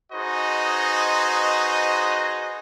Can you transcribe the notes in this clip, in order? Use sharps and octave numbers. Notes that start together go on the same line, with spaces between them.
D#4 F#4 G#4 B4 C5 D#5